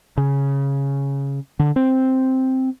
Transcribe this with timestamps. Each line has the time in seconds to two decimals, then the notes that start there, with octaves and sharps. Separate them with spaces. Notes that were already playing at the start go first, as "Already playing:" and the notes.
0.17 C#3
1.59 D3
1.76 C4